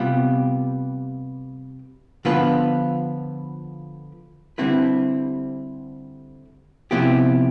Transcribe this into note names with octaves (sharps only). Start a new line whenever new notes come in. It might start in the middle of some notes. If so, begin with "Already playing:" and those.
Already playing: C3 G3 B3 F4
D3 F3 B3 F4 B4
D3 G3 C4 E4 B4
C3 F3 B3 E4 G4